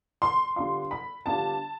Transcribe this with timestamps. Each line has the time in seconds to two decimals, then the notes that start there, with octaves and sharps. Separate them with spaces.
0.22 C6
0.56 D3 G3 B3 D4 F4 C6
0.91 B5
1.26 D3 G3 B3 D4 F4 A5